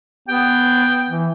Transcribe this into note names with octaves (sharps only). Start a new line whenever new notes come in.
B3 G5
E3